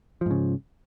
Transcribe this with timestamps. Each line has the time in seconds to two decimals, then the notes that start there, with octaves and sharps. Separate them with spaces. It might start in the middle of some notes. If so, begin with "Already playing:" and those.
0.21 F3
0.26 G#2
0.31 C#3